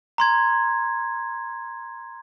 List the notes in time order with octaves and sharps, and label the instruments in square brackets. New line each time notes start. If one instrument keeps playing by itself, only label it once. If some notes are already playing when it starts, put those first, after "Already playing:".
[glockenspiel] A#5 C6 G#6